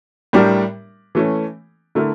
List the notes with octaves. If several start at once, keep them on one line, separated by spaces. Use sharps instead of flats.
A2 G3 D4 G4 A#4
E3 A3 C#4
D3 A3 E4 A#4